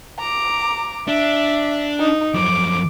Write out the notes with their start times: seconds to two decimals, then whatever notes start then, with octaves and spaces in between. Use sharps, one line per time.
0.20 A#5 D6
1.08 D4 E5
2.00 D#4
2.34 F#2 F3 D6